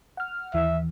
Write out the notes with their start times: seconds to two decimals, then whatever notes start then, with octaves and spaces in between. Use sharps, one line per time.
0.17 F#5 F6
0.54 D#2 E3 E5